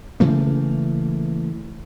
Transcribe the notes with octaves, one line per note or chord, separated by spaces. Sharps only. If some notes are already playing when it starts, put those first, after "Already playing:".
C#3 E3 A3 A#3